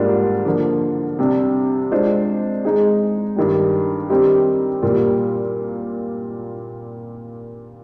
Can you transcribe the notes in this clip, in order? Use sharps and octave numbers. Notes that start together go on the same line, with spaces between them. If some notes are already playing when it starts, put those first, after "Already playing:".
Already playing: G#2 G3 A#3 D4 F4
D3 F3 A#3
C3 G3 D4
G#3 D4 F4 C5 D#5
G#3 D#4 G#4
G2 D#3 G3
D#3 G3 C4 D#4 G4
A#2 G3 A#3 F4